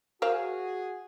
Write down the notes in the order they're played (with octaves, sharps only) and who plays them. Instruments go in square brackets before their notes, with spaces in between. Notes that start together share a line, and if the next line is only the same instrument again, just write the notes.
[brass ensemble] F#4 G#4 [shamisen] A#4 C5 F5